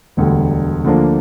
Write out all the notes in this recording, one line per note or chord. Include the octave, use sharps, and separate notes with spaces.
E1 D2 D3 G3
D2 D3 F3 A#3 D4